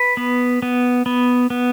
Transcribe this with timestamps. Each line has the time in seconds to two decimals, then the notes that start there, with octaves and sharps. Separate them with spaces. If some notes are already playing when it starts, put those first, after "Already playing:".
Already playing: B4
0.17 B3
0.62 B3
1.06 B3
1.50 B3